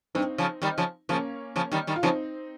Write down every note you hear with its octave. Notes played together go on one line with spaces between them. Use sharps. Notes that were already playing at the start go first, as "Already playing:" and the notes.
G2 C4 D#4
C#3 F3
D#3 G3
C#3 F3
C#3 F3 A#3 C#4
C#3 F3
D#3 G3
D#3 G3
F4
C#3 F3 C4 D#4